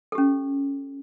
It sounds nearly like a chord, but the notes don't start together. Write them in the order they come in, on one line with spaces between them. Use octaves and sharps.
A4 G4 C#4